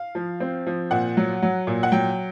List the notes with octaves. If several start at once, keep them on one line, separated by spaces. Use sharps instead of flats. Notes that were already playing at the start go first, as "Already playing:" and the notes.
Already playing: F5
F3
C4
F3
A#2 F#5
F#3
F#3
A#2
F#5
F#3 G5